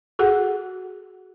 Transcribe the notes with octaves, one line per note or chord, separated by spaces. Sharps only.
F#4 G#4 A4 F#5